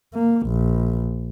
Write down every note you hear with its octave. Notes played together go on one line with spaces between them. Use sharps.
A#3
A#1